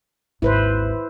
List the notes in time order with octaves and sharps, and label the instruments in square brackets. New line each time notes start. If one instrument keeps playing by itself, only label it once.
[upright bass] G#1 D#2 [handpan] E4 B4 C5